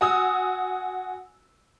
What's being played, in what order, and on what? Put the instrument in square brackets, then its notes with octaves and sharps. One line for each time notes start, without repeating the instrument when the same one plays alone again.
[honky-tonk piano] F#4 G#5 D#6 E6